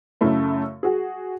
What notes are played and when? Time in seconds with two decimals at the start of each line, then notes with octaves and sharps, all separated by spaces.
0.21 F#2 C#3 A3 E4
0.83 F#4 G#4